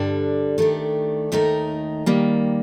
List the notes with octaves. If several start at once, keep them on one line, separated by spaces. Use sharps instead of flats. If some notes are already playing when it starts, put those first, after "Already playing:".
Already playing: G2 D3 G3 D4
D#3 A3 D4 G4
D#2 D#3 A3 D#4 A#4
D#3 G3 A#3